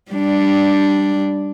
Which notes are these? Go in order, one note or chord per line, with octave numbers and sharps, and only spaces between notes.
G3 D4